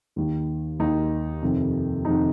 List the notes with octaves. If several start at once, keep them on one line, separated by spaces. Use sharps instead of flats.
D#2 D#3
D#2 D#3 D#4
F2 C3 D#3
F2 C3 D#3 D#4